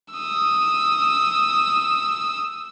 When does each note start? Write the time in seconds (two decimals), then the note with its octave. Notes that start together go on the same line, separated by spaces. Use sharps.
0.14 D#6 E6